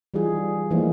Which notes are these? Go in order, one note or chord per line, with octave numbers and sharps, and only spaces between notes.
E3 G3 D#4 F4 G#4
E3 F3 A3 A#3 D#4